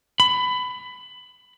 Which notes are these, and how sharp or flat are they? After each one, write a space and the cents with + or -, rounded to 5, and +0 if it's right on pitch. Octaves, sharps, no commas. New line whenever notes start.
B5 +20